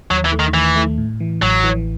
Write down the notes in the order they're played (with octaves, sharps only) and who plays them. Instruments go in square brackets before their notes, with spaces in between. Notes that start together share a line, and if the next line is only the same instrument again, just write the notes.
[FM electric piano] D#2 [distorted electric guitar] F#3
[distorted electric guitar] E3
[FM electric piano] A3
[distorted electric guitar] D#3
[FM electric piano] D#3 [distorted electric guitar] E3
[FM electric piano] A3
A2
E3
[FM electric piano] A1 [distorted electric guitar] F#3
[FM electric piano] E3